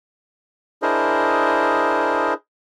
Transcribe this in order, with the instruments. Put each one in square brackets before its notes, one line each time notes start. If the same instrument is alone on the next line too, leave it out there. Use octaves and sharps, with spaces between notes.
[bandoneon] D4 E4 G#4 A#4 C5 D#5